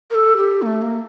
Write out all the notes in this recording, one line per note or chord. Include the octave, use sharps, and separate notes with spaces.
A#4
A4
G4
A#3
A3
A#3